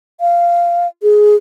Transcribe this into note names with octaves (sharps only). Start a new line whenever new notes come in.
F5
G#4